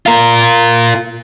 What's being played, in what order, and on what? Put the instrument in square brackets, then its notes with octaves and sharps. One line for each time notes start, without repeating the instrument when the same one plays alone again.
[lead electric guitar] F4 A#4